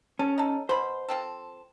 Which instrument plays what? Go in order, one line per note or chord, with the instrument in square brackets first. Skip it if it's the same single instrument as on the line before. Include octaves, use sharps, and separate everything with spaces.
[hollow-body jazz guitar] C#4 [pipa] A4
[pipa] D#4 A4
[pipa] B2 B5 [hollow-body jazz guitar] C5
[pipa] F3 C4 A4